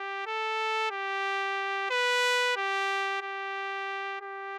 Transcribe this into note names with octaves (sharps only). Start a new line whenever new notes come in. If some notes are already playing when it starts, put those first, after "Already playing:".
Already playing: G4
A4
G4
B4
G4
G4
G4